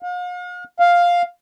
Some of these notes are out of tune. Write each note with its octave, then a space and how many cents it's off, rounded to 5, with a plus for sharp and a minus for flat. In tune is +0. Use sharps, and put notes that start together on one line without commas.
F5 +45
F5 +5